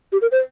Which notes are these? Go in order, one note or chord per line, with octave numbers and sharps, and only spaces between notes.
G4
A#4
C5